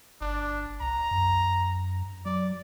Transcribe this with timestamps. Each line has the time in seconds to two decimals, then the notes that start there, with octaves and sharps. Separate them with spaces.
0.21 G1 D4
0.81 C2 A#5
1.11 F#2
2.26 F#3 D5